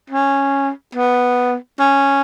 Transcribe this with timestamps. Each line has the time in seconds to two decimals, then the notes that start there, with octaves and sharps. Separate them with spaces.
0.10 C#4
0.95 B3
1.80 C#4